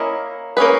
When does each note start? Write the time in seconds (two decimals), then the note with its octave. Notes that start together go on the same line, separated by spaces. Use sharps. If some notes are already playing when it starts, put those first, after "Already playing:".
Already playing: A#3 C#4 E4 A#4 D#5
0.57 A#3 C#4 G#4 B4